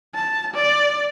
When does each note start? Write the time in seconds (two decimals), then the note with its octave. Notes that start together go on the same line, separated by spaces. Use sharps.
0.15 A5
0.54 D5